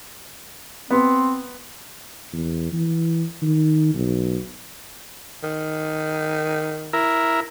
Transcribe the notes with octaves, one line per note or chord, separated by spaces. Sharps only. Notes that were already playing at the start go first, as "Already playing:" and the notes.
B3 C4
E2
E3
D#3
B1
D#3
E4 A#4